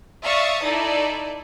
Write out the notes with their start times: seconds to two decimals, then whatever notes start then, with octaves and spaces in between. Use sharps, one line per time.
0.24 D5 E5 F5 C#6 D#6 A6
0.63 D#4 E4 A4 D5